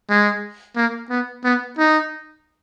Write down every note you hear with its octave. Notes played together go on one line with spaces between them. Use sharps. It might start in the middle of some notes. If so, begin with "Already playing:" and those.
G#3
A#3
B3
B3
D#4